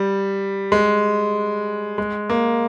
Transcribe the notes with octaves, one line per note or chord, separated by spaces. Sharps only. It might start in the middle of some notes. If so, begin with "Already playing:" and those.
Already playing: G3
G#3
G#3
A#3